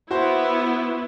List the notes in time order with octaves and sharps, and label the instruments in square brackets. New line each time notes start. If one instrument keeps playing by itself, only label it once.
[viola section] B3 E4 [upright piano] F#4 C5